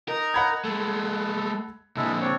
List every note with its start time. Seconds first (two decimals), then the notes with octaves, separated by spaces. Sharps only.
0.08 D#4 A#4 A#5
0.34 F#5 B5 G#6
0.65 G#3 A3 A4
1.97 A#2 D3 G#3 E4 A4
2.21 C4 D4 C#5